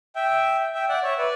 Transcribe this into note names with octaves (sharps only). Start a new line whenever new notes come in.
E5 G5
E5 G5
D5 F#5
C#5 E5
B4 D5